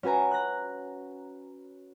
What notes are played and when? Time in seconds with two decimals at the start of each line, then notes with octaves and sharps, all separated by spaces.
0.03 C#4 F#4 B4 G#5 A#5
0.31 F#6 A#6